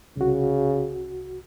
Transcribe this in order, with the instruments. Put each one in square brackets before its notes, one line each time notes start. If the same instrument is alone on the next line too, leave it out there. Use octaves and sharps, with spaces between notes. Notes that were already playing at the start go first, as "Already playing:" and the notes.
[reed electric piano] C2 F#4 [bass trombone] C#3